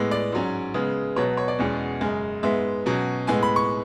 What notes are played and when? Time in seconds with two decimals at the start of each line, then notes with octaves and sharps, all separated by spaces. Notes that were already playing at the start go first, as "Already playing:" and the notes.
Already playing: A2 G#3 B3
0.11 D5
0.32 G#2 F#3 C#4
0.74 C#3 G#3 B3
1.16 B2 F#3 B3 C#5
1.37 C#5
1.48 D5
1.59 E2 B2 G#3 C#4
2.01 F#2 C#3 G#3
2.43 G#2 G#3 B3 E5
2.86 B2 F#3 C#4
3.27 A2 G#3 B3 G#5
3.43 B5
3.56 C#6